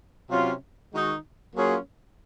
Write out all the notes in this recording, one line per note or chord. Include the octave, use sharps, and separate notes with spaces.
C3 F#3 C#4 F4
D#3 G#3 D#4 F#4
F#3 A#3 C#4 F4 G#4